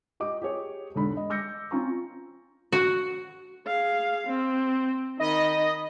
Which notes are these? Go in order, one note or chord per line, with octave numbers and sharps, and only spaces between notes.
G4 D#5 D6
G4 G#4 C#5
E1 G#2 D3 B5
D#5
D6 E6 G6 A#6 C#7
C4 C#4 F4 A#5 C#6
F#4
G#4 F5
C4
D#3 D#5 B5